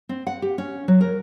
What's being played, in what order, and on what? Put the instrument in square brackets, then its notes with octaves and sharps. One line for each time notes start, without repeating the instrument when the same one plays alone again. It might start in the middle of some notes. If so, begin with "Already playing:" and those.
[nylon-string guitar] C4
F#5
G4
C#4
F#3
A#4